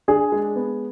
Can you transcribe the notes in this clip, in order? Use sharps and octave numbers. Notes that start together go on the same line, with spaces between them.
D4 G#4
G#3
B3